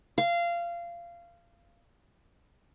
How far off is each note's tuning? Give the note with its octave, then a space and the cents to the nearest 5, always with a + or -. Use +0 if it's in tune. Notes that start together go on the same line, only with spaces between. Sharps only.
F5 -20